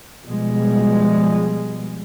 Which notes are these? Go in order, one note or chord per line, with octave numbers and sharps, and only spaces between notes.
B2 F3 G3 G#3